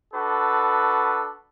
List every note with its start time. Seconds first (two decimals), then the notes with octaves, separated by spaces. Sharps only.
0.13 D4 F#4 A4 B4